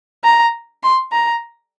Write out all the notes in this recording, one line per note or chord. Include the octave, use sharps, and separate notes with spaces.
A#5
C6
A#5